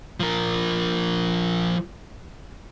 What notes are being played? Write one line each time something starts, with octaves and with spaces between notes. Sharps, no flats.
F3 A#4